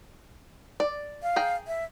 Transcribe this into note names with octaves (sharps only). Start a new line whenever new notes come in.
D5
F5
G#4 G5 A#5
E5